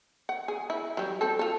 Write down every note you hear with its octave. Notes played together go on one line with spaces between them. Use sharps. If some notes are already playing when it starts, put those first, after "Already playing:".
F#5
G#4
E4
F#3 G3
C4 A4
F4 A4